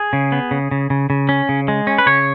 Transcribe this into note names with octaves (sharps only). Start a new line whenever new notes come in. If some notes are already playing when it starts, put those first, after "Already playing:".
Already playing: G#4
C#3
B3
C#3
C#3
C#3
C#3
C#4
C#3
G#3
C#4
B4
C#3 C#5